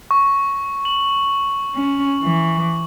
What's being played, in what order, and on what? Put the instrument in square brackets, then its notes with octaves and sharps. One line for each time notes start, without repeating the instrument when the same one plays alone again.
[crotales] C#6
F#7
[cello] C#4
E3